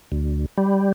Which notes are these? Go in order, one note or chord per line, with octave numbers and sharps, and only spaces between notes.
D2
G3